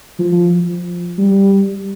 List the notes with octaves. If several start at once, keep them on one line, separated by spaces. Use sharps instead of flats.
F3
G3